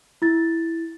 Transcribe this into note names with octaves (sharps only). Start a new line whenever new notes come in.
E4 A6